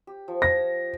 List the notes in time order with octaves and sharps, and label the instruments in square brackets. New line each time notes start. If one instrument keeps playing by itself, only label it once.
[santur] G4
F3
[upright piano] A#6